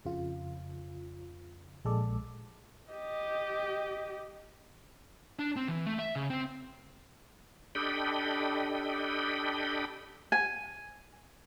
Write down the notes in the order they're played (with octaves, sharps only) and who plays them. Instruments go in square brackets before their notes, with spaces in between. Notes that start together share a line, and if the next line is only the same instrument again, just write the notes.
[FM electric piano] F2 C#3 F4
A#1 G#3 A4 D5
[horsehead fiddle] G4 D#5
[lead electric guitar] D4
C4
E3
A3
E5
C#3
C4
[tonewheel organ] D4 G4 A4 D#5 G5 B5
[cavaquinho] G#5